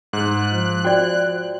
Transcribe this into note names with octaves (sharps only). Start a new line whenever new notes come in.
G#2 F#6
F3
F#4 D5 G5